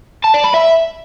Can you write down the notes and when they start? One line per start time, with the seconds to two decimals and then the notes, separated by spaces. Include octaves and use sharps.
0.24 A5
0.34 D5
0.44 B5
0.54 E5